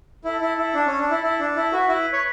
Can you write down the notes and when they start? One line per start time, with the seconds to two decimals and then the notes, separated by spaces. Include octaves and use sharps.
0.24 E4 A4
0.41 E4
0.58 E4
0.74 D4
0.86 C#4
0.98 D4
1.10 E4
1.23 E4
1.40 D4
1.56 E4
1.72 F#4 B4
1.89 E4
2.13 C#5